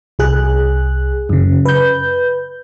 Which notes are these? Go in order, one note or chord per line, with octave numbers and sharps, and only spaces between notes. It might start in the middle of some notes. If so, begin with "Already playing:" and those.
C2 G#4 F#6
F#2 C#3
B4 G6